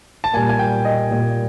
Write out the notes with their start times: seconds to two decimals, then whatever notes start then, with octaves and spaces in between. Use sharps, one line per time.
0.24 A5
0.33 A#2 G3 A#3 G#5
0.49 G#5
0.59 G5
0.85 D#5
1.11 A#2 G3 A#3